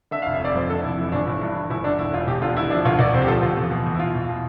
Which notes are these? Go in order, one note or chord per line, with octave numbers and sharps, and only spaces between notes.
D3 E5
F5
F1
E5
F1 D5
F2 C5
D3 A4
F1 E4
E3 E4
G1 D4
G1 E4
G2 E4
E3
G1 E4
D3 D4
E1 E4
E1 F4
E2 G4
D3 F4
E1 E4
F3 D4
D2 F4
D2 D5
C3 C5
G4
F3 A4
D2 F4
E2
B2
E2
E4
B2 F4
E2
B2